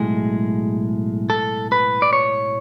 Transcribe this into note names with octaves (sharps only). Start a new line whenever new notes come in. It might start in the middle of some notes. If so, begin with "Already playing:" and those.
Already playing: B1 A2 G#3 G#4
A4
B4
D5
C#5